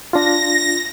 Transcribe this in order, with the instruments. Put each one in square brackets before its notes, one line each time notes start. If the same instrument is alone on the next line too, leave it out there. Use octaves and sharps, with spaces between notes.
[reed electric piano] D4 F4 [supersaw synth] A#6